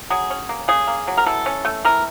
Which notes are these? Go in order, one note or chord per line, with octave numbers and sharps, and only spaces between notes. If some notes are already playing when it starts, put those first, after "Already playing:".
F#3 G#4
C#4
A#3
C#3 G#4
A#3
F#3
A#4
E3 A4
C#4
A3
E3 A#4